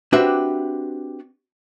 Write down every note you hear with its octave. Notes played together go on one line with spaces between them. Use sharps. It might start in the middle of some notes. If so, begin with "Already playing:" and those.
C4 D4 F#4 G4 B4 E5